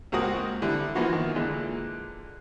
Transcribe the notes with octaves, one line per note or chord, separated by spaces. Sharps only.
C#2 A#3 C4 F#4 F#5 D#6
D3 G3 E4
E3 F3 A#3 B3 F#4
D#3
A#2 D3 E3 G#3